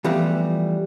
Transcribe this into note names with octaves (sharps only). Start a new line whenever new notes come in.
E3 F3 G3 A3 B3 F#4